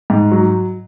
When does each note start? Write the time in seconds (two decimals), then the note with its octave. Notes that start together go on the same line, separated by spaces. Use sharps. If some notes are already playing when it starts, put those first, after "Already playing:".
0.10 G#2
0.31 F#3